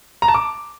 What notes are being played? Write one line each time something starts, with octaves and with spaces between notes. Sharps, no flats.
A#5
A5
D6